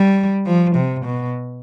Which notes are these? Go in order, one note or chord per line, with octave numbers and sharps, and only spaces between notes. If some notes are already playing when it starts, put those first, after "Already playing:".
Already playing: G3
F3
C3
B2